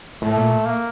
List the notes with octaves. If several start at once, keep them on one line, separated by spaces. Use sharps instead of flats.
A2 A3
A#2
A#3